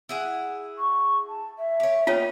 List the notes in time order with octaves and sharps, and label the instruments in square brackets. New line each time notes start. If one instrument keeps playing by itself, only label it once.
[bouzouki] E4 G#4 F#5
[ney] C#6
A5
E5
[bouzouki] G4 C#5
[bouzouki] A#3 B3 D#4 [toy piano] F4 C#5 [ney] G5